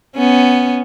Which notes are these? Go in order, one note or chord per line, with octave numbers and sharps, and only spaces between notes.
B3 C#4